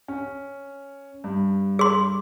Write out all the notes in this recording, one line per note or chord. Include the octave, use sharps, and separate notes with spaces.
C#4
G2
G#4 C6